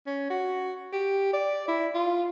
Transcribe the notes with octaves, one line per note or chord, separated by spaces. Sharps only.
C#4
F#4
G4
D5
E4
F4